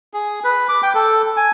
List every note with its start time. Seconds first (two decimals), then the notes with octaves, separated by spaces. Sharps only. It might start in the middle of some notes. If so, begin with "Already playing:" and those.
0.14 G#4
0.44 B4
0.69 D6
0.83 G5
0.95 A4
1.37 G#5